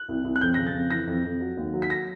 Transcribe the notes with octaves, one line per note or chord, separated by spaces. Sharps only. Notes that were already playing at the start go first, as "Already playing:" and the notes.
Already playing: F#6
C2
C2
F#6
F2 G6
C#3 A#6
A6
F2
E3 A#6
F2
F2
F#3
D#2
F#3
B6
A#6